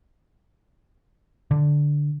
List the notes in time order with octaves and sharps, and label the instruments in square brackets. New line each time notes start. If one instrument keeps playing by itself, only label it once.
[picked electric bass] D3